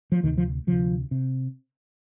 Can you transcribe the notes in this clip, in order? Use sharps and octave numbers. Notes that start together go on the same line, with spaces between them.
F3
D2 C3 D#3
F3
D2 C3 F3
C3